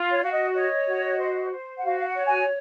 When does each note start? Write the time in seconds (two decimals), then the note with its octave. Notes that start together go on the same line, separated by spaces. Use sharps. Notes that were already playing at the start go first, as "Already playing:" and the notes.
Already playing: F4
0.10 C#5
0.22 F#4 F5
0.32 D#5
0.53 C#5 D#5
0.86 F#4
1.19 C5
1.51 C5
1.78 F#5
1.83 F#4 F5
1.98 F5
2.06 F#5
2.16 C#5
2.27 G#5